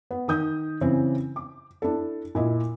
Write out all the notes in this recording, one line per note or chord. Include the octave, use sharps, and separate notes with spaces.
B3
D#3 D#6 G6
C#3 E3 C4
D6
D4 E4 A4
A#2 E4 D#5